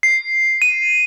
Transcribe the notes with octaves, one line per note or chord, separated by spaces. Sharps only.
C7
D#7